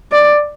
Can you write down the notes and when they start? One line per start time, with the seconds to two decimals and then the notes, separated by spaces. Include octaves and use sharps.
0.12 D5